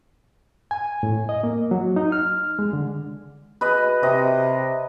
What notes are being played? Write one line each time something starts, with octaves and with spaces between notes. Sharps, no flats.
G#5
A2
D#5
A#3
F#3
D#4
F6
G#3
D3
B4 D#5
C3 D#5